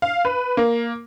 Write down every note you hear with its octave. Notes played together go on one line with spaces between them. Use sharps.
F5
B4
A#3